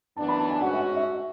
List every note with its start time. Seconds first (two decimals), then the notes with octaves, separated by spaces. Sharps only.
0.16 F#2 E3 B3 D4 A5
0.28 B5
0.39 A5
0.50 G#5
0.61 G#2 G#3 C#4 F#4 F#5
0.73 E5
0.96 E5